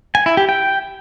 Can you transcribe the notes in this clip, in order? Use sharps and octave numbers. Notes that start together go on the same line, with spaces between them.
G#5
E4
G4
G5